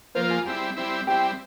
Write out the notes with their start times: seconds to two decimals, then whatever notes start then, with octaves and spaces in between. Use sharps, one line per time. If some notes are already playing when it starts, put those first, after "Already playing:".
0.15 F3 A#3 F4 C5
0.30 G#4
0.46 G3 C4 E4
0.76 G3 C4 E4
1.07 G3 C4 E4 G4